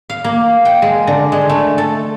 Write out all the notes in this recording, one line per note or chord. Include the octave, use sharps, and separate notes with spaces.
F5
A#3
G5
G#3
D3
G#3
A3
A4